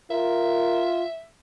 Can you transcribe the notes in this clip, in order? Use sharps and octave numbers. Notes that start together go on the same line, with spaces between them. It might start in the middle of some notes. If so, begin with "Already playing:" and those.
F4 A#4 E5